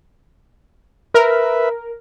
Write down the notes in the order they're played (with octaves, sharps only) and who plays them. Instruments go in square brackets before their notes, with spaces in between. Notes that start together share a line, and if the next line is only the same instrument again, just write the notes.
[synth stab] A#4 [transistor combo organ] B4 E5